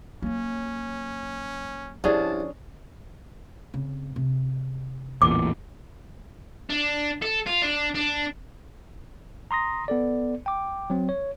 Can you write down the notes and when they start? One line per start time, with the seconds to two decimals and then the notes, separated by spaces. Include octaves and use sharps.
0.22 F#3 A#3 C#4
2.04 C2 F3 C#4 D4 F4 G#4 A5
3.74 C#3 C4
4.16 C3
5.22 A1 E2 A#2 D6
6.70 D4
7.22 A4
7.46 F4
7.62 D4
7.95 D4
9.51 A#5 C6 D#6 A#6
9.88 B3 A4 D5
10.46 G5 D6
10.90 F#3 C4
11.09 C#5